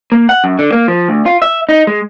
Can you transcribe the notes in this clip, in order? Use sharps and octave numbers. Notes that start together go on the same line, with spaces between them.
A#3
F#5
F#2
D3
A#3
F3
D2
F4
E5
D#4
G#3